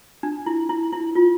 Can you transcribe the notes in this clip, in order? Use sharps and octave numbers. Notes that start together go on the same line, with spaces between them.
D4
E4
E4
E4
F4